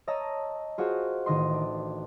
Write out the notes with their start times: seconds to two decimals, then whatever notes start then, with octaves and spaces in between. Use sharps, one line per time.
0.07 C#5 D#5 A5 A#5 E6
0.78 F4 F#4 G#4 C5
1.26 A1 D#3 D#5 C6
1.53 D4